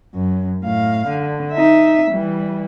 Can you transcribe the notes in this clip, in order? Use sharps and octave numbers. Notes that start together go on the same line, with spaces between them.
F#2
A2 F5
D3
D#4 E5
E3 G3